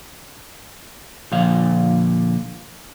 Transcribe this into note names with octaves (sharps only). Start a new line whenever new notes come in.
A#2 D3 F3 F5